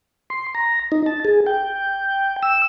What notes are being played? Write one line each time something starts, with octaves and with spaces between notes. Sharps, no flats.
C6
A#5
D#4
A5
G#4
G5
E6